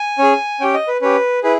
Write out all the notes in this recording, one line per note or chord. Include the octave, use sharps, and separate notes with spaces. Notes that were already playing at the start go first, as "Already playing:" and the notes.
Already playing: G#5
C#4 G#4
C#4 G4 G5
D#5
B4
C#4 G4 B4
E4 G#4 B4